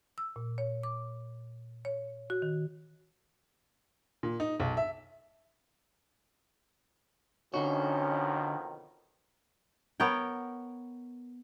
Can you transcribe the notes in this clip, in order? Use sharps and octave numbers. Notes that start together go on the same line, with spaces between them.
E6
A#2
C#5
D6
C#5
F#4
D#3
A#2
D#4
B1
E5
F2 B2 D3 D#3 C#4 D#4 F#4
B3 A#4 C#5 G5